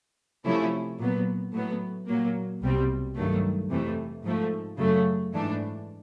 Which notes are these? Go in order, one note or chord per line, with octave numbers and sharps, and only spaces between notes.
C3 F3 A3 C#4 E4
A#2 F#3 B3
A2 F#3 B3
A#2 F#3 A#3
C2 B2 G3 C4
G2 D#3 F#3 A3
F2 C3 E3 A3
G#2 F3 A3
F#2 C#3 F#3 A3
G#2 E3 A3 D4